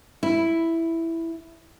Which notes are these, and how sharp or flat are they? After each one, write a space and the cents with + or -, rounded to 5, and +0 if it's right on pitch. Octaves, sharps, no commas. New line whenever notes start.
E4 +0